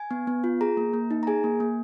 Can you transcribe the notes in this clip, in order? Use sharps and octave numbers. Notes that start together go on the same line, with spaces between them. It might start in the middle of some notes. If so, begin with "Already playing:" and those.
Already playing: G#5
B3
B3
F4
G#4 A#5
A#3
A#3
D#4
A#5
G#4 G#5
A#3
A#3